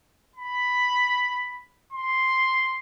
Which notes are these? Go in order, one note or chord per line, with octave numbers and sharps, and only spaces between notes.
B5
C6